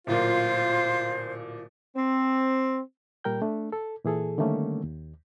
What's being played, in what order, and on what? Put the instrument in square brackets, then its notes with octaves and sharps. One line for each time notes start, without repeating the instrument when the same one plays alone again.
[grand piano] D1 A#2 [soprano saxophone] F4 [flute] C5
[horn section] C4
[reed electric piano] A#2 G3 A#4 G5 G6
A3 D4
A4
A#2 E3 G#4 A4
D3 D#3 G3 A3 A#3 C#4
D#2